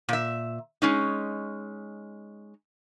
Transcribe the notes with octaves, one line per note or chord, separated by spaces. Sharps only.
A#2 E5
G#3 C#4 D#4